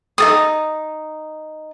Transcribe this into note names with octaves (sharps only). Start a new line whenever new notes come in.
D#4 A4 D#6